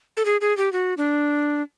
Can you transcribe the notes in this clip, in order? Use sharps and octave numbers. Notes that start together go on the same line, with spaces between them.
A4
G#4
G#4
G4
F#4
D4